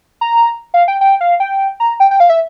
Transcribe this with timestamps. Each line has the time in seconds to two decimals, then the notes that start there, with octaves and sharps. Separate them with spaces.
0.21 A#5
0.74 F5
0.88 G5
1.01 G5
1.21 F5
1.40 G5
1.80 A#5
2.00 G5
2.11 G5
2.20 F5
2.30 E5